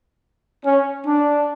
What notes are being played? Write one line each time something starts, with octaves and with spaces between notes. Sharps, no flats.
C#4
D4